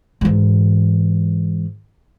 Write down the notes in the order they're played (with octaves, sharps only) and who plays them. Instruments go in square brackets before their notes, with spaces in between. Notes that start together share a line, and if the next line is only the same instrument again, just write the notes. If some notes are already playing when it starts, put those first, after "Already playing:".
[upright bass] G#2 E3